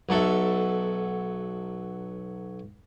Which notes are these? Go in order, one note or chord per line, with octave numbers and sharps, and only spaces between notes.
B1 F#3 A4 E5